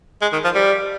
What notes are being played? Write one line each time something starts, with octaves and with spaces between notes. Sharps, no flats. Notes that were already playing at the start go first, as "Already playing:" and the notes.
G#3
D#3
F3
G3